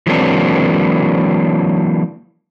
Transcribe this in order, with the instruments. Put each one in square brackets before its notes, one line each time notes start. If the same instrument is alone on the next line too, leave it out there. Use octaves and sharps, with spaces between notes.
[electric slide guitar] E3 F#3 G#3 A#3 C4 D4